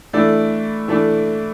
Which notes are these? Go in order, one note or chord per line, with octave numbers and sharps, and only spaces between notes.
E3 A3 D4 A4 D5
E3 A3 D4 A4 D5